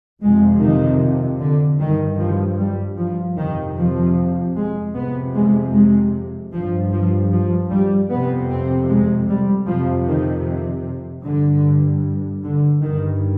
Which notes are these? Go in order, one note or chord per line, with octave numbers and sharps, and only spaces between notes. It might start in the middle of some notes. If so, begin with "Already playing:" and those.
F2 C3 G#3
D#3
D3
G2 D#3
F3
G3
F3
F2 C3 D#3
F3
G#3
F2 C3 B3
G#3
G#3
G2 F3
F3
F3
G3
F2 C3 B3
C4
G#3
G3
F2 C3 F3
D#3
G2 D3
D3
G2 D#3